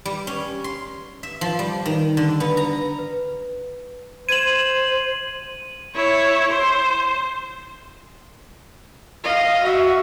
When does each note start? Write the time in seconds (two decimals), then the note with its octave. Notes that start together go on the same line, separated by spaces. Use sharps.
0.05 G3
0.27 C#4
0.64 C6
1.23 E5
1.41 F3
1.59 G3
1.86 D#3
2.17 D3
2.40 B3
2.57 A#5
2.99 B4
4.29 C5 G#6 D#7 E7 F#7
5.95 E4 C#5
6.51 C5
9.24 D#5 F5
9.63 F#4 E5